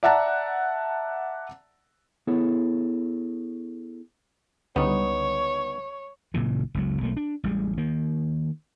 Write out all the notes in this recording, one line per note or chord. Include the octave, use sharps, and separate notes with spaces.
D5 E5 F#5 A5 A#5
B3 E4 G#4 A4 C#5
C#2 D3 G3 B3 D#4 C#5
F#1 A#2 C#3 E3
F#1 C#2 F#3
B1 A3 A#3
D4
A1 G3 G#3
D#3 A#3